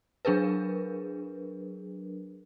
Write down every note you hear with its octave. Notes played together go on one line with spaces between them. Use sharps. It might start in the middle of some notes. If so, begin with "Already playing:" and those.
F#3 D4 G#4 A#4 B4